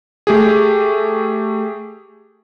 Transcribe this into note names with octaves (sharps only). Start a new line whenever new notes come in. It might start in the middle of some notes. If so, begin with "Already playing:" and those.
A3 G4 G#4